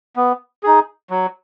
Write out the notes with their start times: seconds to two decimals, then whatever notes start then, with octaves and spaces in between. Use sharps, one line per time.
0.16 B3
0.63 D#4 G#4
1.10 F#3